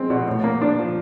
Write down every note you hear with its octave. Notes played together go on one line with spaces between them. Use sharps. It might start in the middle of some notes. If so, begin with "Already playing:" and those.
Already playing: G#3 C4
B2
A2
A#3
D4
F3